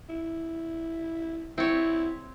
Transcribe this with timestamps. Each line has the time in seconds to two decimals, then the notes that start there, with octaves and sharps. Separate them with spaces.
0.09 E4
1.58 C4 E4 C#5